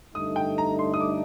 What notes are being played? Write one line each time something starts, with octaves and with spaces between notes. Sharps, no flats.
G2 D3 A3 D#4 D#6
G5
A#5
C6
D#6
D6